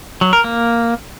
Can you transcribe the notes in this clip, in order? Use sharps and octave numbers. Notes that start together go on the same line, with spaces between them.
F#3
A#4
A#3